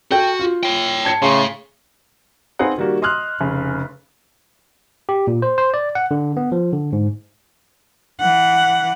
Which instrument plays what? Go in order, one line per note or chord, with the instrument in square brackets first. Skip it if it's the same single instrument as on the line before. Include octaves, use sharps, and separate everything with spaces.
[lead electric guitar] F#4 [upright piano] A4 G5 G6
[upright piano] F4
[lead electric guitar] C#5 G5
[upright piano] A5 G#6 C#7
[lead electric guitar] A2 [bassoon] C#3 [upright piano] C6
[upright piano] C4 D#4 G#4 B4 F5 F#5
D#3 G3 A#3 F#4
D#5 C6 D#6 F6 F#6
F1 C#3
[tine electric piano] G4
A#2
C5
C5
D5
F#5
D3
B3
F3
D3
G#2
[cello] E3 F#5